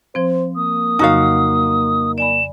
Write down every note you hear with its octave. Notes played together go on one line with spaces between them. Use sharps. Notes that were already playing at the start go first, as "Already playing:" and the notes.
F3 C4 C5
A#3 D#6
F2 C#3 F#3 D#4 F#4 F5
D5 G#5 B5 E7